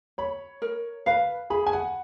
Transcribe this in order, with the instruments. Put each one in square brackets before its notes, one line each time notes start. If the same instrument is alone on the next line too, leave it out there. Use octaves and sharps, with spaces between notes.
[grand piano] C#5 [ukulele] B5
[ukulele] A#4
[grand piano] B4 [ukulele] F5
[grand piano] G#4 [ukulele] B5
[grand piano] G#5
F#5